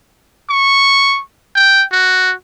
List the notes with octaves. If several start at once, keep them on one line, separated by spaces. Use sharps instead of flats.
C#6
G5
F#4